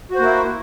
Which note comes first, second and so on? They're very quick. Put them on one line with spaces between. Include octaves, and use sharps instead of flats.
F#4 C5 A#3 E4